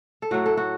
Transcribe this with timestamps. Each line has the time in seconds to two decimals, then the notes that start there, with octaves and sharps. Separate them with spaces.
0.22 A4
0.31 A2 F#3 F#4
0.46 A4
0.57 F#4